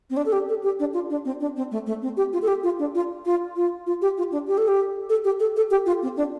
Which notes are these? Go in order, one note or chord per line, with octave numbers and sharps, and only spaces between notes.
C4
D4
A4
G4
A4
G4
D4
F4
D4
C4
D4
C4
A3
A3
C4
G4
F4
A4
G4
F4
D4
F4
F4
F4
F4
G4
F4
D4
G4
A4
G4
A4
G4
A4
A4
G4
F4
C4
D4